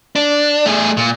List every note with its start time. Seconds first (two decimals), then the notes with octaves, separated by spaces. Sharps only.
0.16 D4
0.66 A3 G#4
0.97 A#2